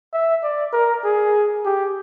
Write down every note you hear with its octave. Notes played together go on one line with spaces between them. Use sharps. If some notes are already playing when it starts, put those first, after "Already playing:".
E5
D5
A#4
G#4
G4